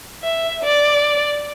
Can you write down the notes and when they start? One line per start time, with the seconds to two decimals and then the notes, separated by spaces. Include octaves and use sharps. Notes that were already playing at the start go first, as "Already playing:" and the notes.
0.23 E5
0.64 D5